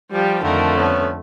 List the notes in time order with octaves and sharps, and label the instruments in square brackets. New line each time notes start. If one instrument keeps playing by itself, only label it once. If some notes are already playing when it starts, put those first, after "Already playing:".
[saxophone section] F3 [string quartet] G3 G4
[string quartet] F2 D3 A3 [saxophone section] D#3 A#3 A#4
[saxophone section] B3 C#4